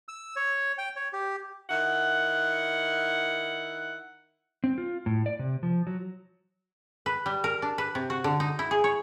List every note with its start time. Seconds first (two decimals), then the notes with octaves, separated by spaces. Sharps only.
0.08 E6
0.36 C#5
0.78 G5
0.96 C#5
1.13 G4
1.70 D#3 E4 F#5
4.64 C4
4.78 F4
5.06 A2
5.26 D5
5.39 C3
5.63 F3
5.87 F#3
7.06 B4
7.26 G3
7.44 A#4
7.62 D4
7.78 B4
7.95 C3
8.10 F#4
8.24 D3
8.40 D#4
8.59 E4
8.71 G#4
8.84 C#5